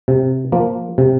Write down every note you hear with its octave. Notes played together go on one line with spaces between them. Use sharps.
C3
F3 A#3
C3